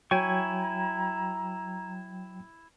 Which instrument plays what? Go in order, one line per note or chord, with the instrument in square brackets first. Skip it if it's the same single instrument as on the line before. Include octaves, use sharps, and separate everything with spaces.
[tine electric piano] F#3 G5 [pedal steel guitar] E4 G#5 C#6 [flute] A#5